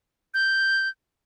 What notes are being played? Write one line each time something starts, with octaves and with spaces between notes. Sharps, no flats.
G6